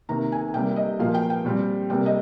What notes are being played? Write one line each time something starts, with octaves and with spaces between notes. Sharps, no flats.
C3 D#3 A#3 A#5
G#5
C3 G3 A#3 G5
D#5
A#2 F3 A#3 F5
G5
G5
A#2 G3 C4
C3 G3 A#3 G5
D#5